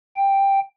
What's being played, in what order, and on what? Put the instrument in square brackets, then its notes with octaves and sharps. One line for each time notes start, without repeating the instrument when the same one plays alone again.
[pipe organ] G5